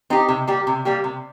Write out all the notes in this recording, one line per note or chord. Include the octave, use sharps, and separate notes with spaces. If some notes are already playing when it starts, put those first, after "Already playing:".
C4 D#4 G4
C3
G3 A#3 G4
C3
G3 A#3 G4
C3